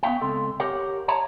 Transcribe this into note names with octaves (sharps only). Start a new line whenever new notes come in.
B3 C#4 E4 E5 F5 G5
C#2 C4 A4
G4 A#4 C#5 F#5
C#5 E5 A5 A#5